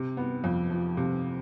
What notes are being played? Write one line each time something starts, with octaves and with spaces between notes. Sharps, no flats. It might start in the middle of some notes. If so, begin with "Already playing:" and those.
Already playing: C3
B3
F2
F3
C3